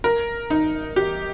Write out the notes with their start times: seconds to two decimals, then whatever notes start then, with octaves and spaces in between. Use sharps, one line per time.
0.04 A#4
0.50 D#4
0.96 G4